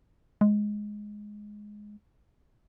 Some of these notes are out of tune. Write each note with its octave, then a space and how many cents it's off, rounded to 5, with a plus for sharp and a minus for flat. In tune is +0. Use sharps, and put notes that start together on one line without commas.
G#3 +5